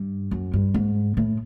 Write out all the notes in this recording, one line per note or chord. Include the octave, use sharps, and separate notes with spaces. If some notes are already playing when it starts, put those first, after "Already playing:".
Already playing: G2
F#2
G2
G#2
A2